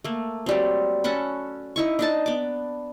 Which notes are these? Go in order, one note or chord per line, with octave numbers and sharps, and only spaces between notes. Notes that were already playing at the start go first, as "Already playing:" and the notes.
A3 A#3
F#3 G3 C4
C#4 A4 F#5 B5
D#4 E4 C#6
D4 D#4 A5
B3 D6